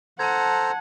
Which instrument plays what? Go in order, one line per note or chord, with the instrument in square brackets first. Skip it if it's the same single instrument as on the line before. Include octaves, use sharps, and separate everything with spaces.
[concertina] A4 C5 A#5 [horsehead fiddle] F#5 [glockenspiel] A5 G#6